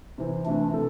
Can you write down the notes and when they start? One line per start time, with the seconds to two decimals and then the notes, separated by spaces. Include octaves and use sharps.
0.18 C3 E3 C4
0.45 C3 E3 A3 C4 D4
0.73 C3 A3 C4 A4